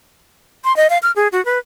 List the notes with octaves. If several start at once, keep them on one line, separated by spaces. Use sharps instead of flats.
C6
D#5
F5
F6
G#4
F#4
B4